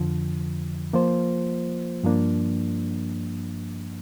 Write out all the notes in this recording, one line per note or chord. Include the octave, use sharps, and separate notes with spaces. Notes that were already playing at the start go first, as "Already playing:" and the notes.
Already playing: F2 D3 F3
F3 A#3 F4 C5
G2 F3 A#3 D4